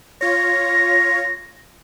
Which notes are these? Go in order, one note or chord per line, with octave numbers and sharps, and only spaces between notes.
F4 C#5 A#6